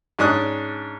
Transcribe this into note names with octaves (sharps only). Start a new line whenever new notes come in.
G#2 C#4 D4 D#6 F#6